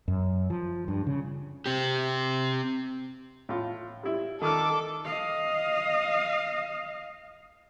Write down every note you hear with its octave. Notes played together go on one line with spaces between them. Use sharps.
F#2
F3
G2
C#3
C4 G4
A2 F4
G3 E4
D#3 A4 D6 D#6 F6
D#5 F5